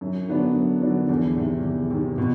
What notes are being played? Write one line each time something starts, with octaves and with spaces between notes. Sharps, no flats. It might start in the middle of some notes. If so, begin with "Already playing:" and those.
F#2
D3 F#3 B3 D4
F#2
D3 F#3 B3 D4
E2
C3 D#3
E2
C3 D#3
B2